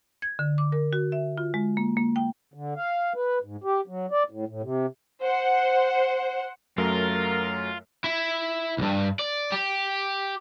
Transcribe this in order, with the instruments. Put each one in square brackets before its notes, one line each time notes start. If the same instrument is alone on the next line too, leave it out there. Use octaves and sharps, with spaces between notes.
[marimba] G#6
D3
D6
A#4
F#4
E5
F4
G#3
A#3
A#3
G5
[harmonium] D3
F5
B4
G#2
G4
F#3
D5
A2
A2
C3
[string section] C5 F#5
[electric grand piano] F#2 F#3 A3 [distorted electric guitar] F4 [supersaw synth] A#4
[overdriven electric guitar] E4
B1 G2
D5
G4